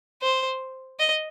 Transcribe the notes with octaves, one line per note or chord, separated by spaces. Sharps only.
C5
D#5